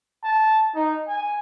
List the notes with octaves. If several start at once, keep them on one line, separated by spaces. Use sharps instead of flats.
A5
D#4
G#5